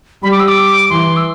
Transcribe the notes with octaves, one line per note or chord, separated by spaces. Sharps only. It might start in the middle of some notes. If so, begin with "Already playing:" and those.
G3 B5
D6
E6
D6
E3 C6
E6